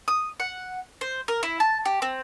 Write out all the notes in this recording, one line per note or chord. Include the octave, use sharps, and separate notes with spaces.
D#6
F#5
C5
A#4
E4
A5
G4
C4